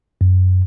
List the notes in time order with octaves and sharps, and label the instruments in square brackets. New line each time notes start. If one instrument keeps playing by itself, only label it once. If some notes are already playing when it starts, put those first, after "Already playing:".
[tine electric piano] F#2